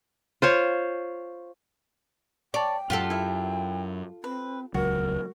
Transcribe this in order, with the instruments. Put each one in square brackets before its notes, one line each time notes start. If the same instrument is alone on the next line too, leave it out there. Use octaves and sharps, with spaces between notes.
[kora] F4 C5 C#5
[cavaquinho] C#5 A5 [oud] D5 [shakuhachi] G5
[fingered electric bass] F#2 [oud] F4 G4 A4 [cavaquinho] F#5
[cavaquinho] E4 E5
[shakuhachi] C4 [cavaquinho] B4
[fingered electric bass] D#1 C#2 F#3 [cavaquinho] F#4 [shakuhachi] A#4